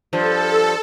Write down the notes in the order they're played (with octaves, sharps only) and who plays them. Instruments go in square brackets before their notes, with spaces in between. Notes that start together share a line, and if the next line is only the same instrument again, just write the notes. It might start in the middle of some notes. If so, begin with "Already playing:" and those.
[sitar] G2 F3 [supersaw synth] A4